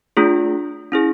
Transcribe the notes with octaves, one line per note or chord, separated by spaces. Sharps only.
A3 D4 F4 G#4
C#4 E4 G#4